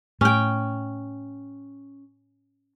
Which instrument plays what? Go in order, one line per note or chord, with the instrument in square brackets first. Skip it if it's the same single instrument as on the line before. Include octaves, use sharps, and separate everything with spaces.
[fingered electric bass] A2 [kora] C#4 G5